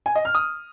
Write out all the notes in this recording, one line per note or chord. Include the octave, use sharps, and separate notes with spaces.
G#5
D#5
F6
D#6